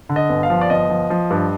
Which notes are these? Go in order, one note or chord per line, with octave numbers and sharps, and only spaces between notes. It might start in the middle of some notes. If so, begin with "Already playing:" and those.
D3
D#5
G1
F5
F3
D5
G1 D#5
F3
F3
G2